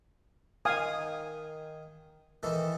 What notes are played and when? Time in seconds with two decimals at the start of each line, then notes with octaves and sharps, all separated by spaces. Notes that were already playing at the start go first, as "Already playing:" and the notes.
0.65 D#3 F5 G#5 D#6
2.43 D#3 E3 A4